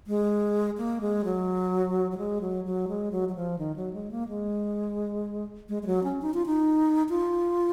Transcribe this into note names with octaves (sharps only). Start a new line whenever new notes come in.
G#3
A#3
G#3
F#3
F#3
G#3
F#3
F#3
G#3
F#3
F#3
F3
D#3
F#3
G#3
A#3
G#3
G#3
G#3
F#3
C#4
D#4
F4
D#4
F4